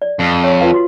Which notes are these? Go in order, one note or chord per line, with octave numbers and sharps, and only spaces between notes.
D5
F2
C#5 F5 C#6
F4 B4 F5
F#4 C6